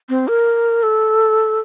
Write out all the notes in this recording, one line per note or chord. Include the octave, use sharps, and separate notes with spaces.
C4
A#4
A4